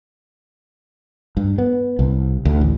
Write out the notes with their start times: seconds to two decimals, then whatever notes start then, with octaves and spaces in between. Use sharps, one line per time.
1.37 G2
1.58 B3
1.99 C2
2.45 D2
2.61 A1